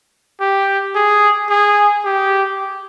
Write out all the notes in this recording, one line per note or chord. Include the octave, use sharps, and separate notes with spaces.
G4
G#4
G#4
G4